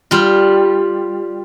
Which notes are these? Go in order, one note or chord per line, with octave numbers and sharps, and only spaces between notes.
G3 F4